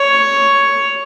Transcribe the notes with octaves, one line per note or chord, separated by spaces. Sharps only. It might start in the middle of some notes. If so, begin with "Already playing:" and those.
Already playing: C#5